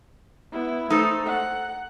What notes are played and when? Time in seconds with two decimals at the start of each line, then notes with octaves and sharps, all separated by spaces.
0.52 B3 E4
0.90 A3 D#4 A4 C5
1.25 F#5